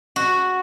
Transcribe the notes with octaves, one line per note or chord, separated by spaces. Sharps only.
F#4